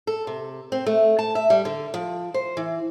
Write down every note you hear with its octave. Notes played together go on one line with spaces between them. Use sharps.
A4
C3
C4
A3
A5
E5
G3
D3
F3
C5
E3